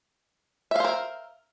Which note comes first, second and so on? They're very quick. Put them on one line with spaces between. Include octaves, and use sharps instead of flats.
E5 F5 C5 A#4